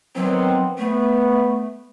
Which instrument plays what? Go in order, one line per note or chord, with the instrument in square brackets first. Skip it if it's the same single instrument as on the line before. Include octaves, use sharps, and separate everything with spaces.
[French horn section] D#3 B3 C4 [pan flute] F#3
[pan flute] A3 [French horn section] B3